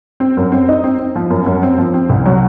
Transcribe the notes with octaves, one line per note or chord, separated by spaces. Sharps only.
C4
F#2
C4
D#4
C4
C4
F3
F#2
F#2
C4
F3
C4
C2
F#3